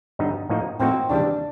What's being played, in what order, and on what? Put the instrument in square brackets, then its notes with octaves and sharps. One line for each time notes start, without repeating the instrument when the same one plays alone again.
[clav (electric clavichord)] G2 D3 F#3 B3 D#4
A2 F3 A#3 D#4 F#4
[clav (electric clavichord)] A2 F3 A#3 D#4 F#4 [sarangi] C4
[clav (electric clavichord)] D#2 C#3 E3 G3 [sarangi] D4